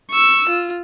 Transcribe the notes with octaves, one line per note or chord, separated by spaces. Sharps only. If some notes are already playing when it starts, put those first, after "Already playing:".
C#6 E6
F4